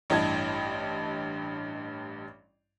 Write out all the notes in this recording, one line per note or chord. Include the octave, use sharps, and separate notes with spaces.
A1 G2 E4 D#5 A5 G#6